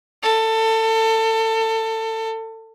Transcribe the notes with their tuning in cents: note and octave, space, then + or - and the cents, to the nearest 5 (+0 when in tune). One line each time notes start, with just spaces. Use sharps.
A4 +25